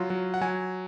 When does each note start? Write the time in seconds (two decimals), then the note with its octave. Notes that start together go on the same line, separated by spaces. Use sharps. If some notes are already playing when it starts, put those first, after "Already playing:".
Already playing: F#3 F4
0.10 F#3
0.34 F#5
0.41 F#3 G#5